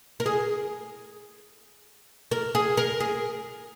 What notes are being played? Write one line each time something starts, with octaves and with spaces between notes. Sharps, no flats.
A#4
G#4
A#4
G#4
A#4
G#4